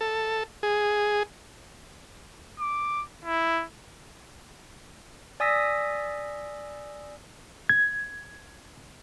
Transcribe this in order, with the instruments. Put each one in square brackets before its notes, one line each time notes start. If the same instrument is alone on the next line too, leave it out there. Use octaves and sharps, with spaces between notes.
[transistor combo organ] A4
G#4
[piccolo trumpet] D6
E4
[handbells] D5 G#5 D#6 E6 A#6 B6
[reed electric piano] G#6